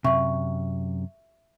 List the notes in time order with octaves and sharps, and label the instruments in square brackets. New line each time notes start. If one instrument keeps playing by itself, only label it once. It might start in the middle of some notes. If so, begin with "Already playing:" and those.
[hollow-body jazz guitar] F#2 C3 [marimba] E5 C#6